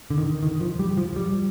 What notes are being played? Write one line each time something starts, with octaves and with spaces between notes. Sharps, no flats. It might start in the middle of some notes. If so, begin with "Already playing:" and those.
D3
D#3
D#3
F3
G3
F3
G3